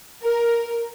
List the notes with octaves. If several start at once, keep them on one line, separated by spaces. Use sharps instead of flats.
A#4